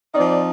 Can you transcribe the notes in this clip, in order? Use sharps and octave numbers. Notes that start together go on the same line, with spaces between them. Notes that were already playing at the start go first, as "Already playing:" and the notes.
F3 C4 D#4 D5